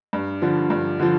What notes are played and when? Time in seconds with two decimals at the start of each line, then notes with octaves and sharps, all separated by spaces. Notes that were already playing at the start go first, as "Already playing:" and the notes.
0.13 G2
0.42 D3 F3
0.70 G2
0.99 D3 F3